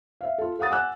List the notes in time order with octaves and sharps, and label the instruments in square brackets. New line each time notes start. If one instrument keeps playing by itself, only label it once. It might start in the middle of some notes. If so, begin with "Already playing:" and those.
[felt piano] E5 F5
F4 A4
A4 F5 F#5 D#6 A6
F#5 G#5 D6 E6 F#6